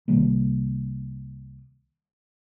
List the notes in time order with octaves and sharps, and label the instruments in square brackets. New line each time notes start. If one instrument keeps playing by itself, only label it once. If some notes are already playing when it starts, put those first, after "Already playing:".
[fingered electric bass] C2 D#3 G3 A#3